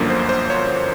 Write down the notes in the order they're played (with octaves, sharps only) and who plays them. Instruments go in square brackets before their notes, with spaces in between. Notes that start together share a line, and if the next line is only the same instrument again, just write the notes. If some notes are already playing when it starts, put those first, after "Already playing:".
Already playing: [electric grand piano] G1 F#2 D3 F3 A#3
C5
C5
C#5